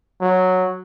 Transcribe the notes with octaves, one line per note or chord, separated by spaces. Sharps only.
F#3